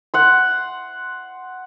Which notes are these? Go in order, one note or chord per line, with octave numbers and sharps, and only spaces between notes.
F#5 C6